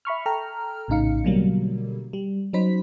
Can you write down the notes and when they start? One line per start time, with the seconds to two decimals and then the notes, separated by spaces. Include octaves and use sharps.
0.05 E5 B5 C#6 F6
0.26 A4 G5 A#5 F6
0.88 A#1 A2 C#3 D#4 F5 C#7
1.24 B2 D3 F#3 G3 A#3
2.13 G3
2.53 F#3 C#4 D#4 C5 B5 B6